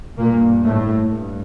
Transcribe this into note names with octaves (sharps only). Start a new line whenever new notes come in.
G2 A#2 A#3
A2 A3
G2